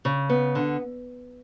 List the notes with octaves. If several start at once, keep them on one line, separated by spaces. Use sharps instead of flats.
C#3
B3
D3